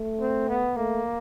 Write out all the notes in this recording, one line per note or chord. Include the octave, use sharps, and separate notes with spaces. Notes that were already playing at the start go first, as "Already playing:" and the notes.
Already playing: A3
C4
B3
A3 A#3